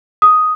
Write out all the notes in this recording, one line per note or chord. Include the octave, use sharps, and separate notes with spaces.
D#6